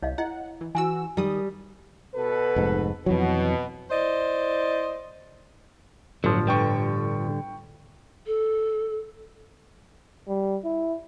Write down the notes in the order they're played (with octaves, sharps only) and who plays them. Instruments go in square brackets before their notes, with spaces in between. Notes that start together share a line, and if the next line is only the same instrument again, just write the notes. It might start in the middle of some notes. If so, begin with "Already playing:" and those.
[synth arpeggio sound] C2 [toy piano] C#5 D#5 F5
[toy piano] E4 D#5 [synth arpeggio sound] F#5
[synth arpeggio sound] E3
[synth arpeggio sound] E3 F#4 E6 [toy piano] G#5
[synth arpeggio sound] D#3 D#6 [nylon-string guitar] G3
[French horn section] B2 A4 B4
[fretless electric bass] F1 G#2
[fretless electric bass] F2 E3 F#3 [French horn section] B2
[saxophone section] E4 C5 D5 D#5
[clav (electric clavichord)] G1 F3 [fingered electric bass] A2 [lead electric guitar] F#3
[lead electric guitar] D3 G3 [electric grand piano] B4 G5 C#6
[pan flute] A4
[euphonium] G3
E4